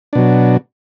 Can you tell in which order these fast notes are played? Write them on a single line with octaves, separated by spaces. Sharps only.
D4 B2 F#3